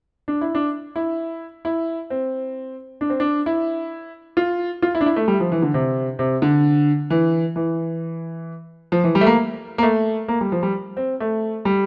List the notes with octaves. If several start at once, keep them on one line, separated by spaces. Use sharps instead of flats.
D4
E4
D4
E4
E4
C4
D4
C4
D4
E4
F4
F4
E4
D4
E4
A3
G3
F3
E3
D3
C3
C3
D3
E3
E3
F3
E3
G3
A3
A#3
A#3
A3
A#3
G3
F3
G3
C4
A3
G3